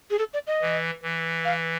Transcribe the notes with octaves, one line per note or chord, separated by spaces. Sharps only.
G#4
A4
D5
D#5
E3
E3
F5